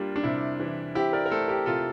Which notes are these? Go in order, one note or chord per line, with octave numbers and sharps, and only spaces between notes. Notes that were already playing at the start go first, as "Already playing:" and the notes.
Already playing: G3 A#3 D4 F4
D4
C3 E4
E3
C4 E4 G4
A#4 D5
A#4
A3 A4 C5
G4 A#4
C3 F4 A4